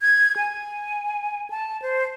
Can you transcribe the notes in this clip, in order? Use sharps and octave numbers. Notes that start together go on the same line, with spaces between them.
G#6
G#5
A5
C5